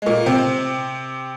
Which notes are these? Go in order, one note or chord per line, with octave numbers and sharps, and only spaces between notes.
G#3
A#2 A#3
C3 C4